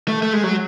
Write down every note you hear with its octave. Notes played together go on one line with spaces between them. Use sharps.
A3
A3
G#3
F#3